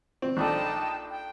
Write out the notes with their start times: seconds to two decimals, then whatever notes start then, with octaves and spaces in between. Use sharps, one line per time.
0.22 C4
0.37 A#1 D4 D#4 A4 G5 A5
1.09 G5